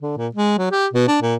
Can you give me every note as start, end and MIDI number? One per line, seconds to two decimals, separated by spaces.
0.02 0.13 50
0.17 0.28 46
0.35 0.54 56
0.58 0.69 54
0.71 0.87 67
0.93 1.06 47
1.08 1.18 62
1.22 1.35 46